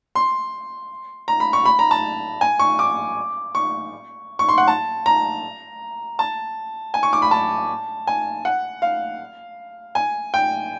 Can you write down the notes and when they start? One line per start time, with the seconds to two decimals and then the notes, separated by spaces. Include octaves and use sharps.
0.15 C6
1.28 A#5
1.40 B5
1.53 C#6
1.65 B5
1.79 A#5
1.91 A5
2.41 G#5
2.59 C#6
2.79 D6
3.55 C#6
4.39 C#6
4.49 C6
4.58 F#5
4.68 A5
5.06 A#5
6.19 A5
6.94 G#5
7.03 C#6
7.13 D6
7.22 B5
7.31 A5
8.07 G#5
8.45 F#5
8.82 F5
9.95 G#5
10.34 G5